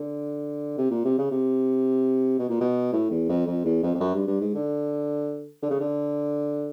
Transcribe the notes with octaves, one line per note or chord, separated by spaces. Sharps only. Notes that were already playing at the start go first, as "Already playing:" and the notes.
Already playing: D3
C3
A#2
C3
C#3
C3
B2
A#2
B2
A2
E2
F2
F2
E2
F2
F2
F#2
G2
G2
G#2
D3
D3
C#3
D3